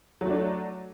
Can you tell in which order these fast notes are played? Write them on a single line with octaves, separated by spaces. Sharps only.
F#3 A3 D4